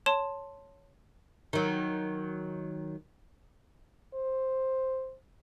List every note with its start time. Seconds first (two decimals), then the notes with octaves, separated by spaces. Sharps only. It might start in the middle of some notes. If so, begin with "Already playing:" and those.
0.06 C#5 A5 C6 E7
1.53 D#3 F#3
4.14 C5